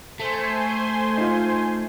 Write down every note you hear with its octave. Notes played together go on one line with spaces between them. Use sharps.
A3 C5 G#5 C6
D#4 F4